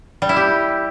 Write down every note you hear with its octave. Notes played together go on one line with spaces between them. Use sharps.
G3
E4
G4